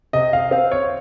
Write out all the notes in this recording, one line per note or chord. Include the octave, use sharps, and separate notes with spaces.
C3 D#5
F5
C4 F5
C#5